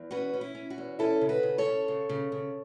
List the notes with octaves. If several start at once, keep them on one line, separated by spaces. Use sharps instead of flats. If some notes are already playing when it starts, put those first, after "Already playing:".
Already playing: E2
C#4 F#4 B4
C#4
E4
C#4
F#4
E2
C#4 E4 A4
C#3
F#4 B4
C#3
A4 C#5
C#4
C#3
C#3
C#3